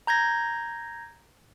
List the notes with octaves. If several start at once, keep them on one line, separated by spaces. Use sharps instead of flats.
A#5 G6 G#6 A#6